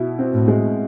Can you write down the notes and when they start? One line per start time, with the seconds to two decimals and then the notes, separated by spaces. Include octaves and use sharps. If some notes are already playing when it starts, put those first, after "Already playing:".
Already playing: B2 E4
0.19 C4
0.34 A2
0.48 G#3